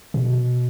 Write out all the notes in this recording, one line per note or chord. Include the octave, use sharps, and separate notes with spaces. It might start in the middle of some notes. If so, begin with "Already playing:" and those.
B2